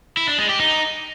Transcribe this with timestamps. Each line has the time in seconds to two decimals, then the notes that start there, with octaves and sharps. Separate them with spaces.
0.17 E4
0.28 D4
0.38 G#3
0.49 G4
0.60 D#4